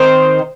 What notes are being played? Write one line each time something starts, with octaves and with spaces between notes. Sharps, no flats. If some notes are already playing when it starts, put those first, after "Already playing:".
Already playing: D#3 C4 D#4 C5